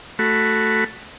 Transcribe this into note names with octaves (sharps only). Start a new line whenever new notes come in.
A3 F#4 B5